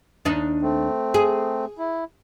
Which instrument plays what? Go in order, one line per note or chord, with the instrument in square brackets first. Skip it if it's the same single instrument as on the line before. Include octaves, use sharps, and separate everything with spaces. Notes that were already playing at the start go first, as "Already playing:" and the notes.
[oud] D#2 D4 D#4
[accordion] A3 C4
[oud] G#4
[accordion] E4